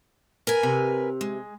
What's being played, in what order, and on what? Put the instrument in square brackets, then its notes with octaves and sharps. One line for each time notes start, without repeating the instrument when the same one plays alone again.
[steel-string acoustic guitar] A#4 B4 G#5
[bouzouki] C3
[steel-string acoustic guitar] G#3